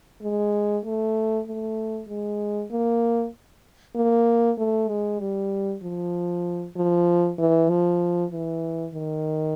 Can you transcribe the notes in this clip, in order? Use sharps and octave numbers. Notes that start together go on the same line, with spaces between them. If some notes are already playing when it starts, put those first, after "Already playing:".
G#3
A3
A3
G#3
A#3
A#3
A3
G#3
G3
F3
F3
E3
F3
E3
D#3